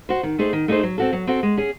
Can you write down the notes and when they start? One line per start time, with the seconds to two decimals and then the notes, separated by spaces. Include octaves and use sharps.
0.09 F#4 C5
0.23 D#3
0.38 A3 D#4 G#4 C5
0.53 D#3
0.68 A3 D#4 G#4 C5
0.83 F#3
0.98 C4 F#4 A4
1.13 F#3
1.27 C4 F#4 A4
1.43 G#3
1.57 C#4 G#4